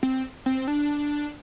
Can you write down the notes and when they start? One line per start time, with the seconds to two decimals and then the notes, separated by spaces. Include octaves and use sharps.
0.03 C4
0.46 C4
0.68 D4